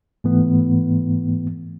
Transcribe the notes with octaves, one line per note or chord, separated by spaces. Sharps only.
G#2 E3 A3 B3